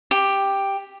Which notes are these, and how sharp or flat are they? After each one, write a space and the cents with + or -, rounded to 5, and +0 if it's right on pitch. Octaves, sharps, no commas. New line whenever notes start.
G4 +5